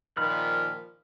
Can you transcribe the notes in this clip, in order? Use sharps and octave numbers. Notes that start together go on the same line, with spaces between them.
A#2 D#3 F3 B5 F6 F#6